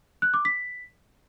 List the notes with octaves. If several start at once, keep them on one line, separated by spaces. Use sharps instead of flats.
F#6
D6
B6